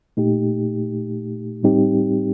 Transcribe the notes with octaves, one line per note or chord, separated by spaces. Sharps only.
A#2 A3 D#4 G4
A2 G3 C4 D#4 G4